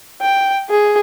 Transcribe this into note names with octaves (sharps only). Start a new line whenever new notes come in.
G5
G#4